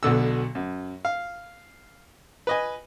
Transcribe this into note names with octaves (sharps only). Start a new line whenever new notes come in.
B1 B2 D3 E6
F#2
F5
B4 D#5 G#5